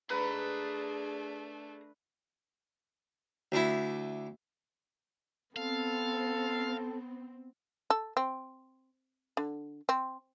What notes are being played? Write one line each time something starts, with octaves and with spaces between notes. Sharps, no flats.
A3 D4 G#4 B4 A#5
D2 D4 E4
B3 C4 A4 F5
A4
C4
D3
C4